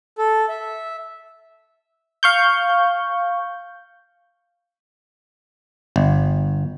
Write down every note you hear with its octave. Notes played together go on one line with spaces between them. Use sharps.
A4
E5
F5 C#6 G6
G1